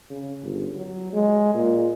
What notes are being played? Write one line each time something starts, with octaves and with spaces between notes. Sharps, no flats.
C#3
G1
F#3
G#3
A#2